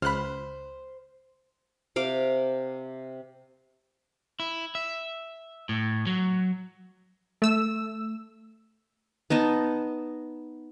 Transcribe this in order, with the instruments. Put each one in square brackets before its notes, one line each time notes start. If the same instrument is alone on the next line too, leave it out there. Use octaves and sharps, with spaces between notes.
[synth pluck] C#2 F#6 [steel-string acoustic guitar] C5 [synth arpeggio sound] B5 F6
[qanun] C3 F5 D6
[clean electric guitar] E4
E5
A2
F#3
[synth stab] A3 E6
[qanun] B3 D#4 D#5 A5